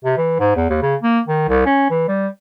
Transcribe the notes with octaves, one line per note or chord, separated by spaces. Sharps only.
C3
E3
G#2
E2
D#2
C#3
A#3
D#3
C2
C#4
E3
G3